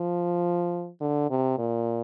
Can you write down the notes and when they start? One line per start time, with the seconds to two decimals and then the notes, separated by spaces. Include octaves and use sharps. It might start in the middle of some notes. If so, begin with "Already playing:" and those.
Already playing: F3
1.01 D3
1.30 C3
1.58 A#2